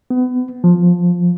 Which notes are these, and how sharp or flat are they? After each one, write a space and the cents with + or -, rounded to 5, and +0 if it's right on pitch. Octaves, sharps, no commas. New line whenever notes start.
B3 +30
F3 +10